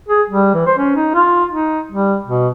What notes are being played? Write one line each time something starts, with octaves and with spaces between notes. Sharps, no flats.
G#4
G3
E3
C5
C#4
D#4
F4
D#4
G3
B2